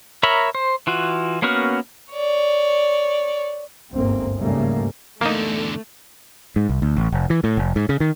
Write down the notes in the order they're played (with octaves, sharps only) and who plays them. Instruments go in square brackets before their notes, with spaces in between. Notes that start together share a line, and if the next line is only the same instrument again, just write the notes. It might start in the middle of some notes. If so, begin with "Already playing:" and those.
[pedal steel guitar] A#4 C#5 E5 A#5 B5
C5
E3 F4 F#4
A#3 B3 C#4 F#4 A#4
[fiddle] C#5 D5
[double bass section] G1 D2 G#2 A#3 C4
G#2 C#3 G3 A3 A#3
[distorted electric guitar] E2 D3 [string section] A3 [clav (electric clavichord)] A#3 D#4
[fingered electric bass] G#2
C2
D2
A1
F1
E3
A2
F1
G#2
C#3
D#3